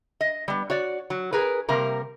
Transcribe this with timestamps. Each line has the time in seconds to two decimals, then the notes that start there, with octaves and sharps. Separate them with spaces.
0.21 D#5
0.48 G3 B3
0.70 F#4 C#5 D5
1.10 F#3
1.33 G#4 A#4 B4
1.69 C3 G3 A#3 A#4